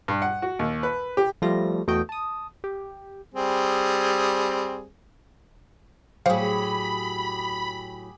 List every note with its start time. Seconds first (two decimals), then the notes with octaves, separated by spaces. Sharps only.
0.08 G2
0.22 F#5
0.42 F#4
0.59 D#2
0.83 B4
1.17 G4
1.42 F3 G3 A3 F4 A#6
1.87 E2 A3 F#4 D#5 G5
2.09 A5 D#6
2.64 G4
3.34 G3 C4 G#4
6.26 A2 F#3 G4 G#4 C5 F5 B5